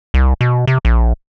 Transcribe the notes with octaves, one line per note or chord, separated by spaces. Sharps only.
C2
B2
C3
A#1